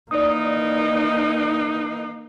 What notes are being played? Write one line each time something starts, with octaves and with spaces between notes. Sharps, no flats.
D#3 E3 A#3 D#4 D5 D#6